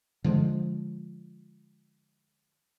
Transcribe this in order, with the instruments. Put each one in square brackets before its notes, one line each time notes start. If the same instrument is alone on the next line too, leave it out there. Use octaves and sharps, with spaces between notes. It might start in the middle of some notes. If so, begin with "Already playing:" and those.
[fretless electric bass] D3 F3 G#3